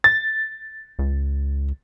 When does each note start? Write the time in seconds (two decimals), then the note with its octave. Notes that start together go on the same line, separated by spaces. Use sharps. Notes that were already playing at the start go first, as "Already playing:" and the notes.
0.04 A6
0.99 C#2